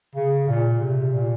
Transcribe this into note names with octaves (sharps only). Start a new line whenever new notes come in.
C#3
A#2
C3
A#2